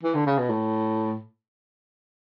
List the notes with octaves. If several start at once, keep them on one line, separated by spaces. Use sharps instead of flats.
E3
D3
C#3
B2
A2